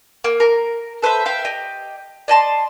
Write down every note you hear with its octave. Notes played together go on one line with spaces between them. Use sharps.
A#3
A#4
A4 B4 C5 E5
E5 F5 G5
G4 D#5
D5 D#5 A5 C6